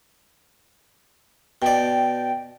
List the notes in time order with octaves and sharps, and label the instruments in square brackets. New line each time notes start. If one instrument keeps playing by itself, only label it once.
[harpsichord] B2 D5 [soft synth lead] G5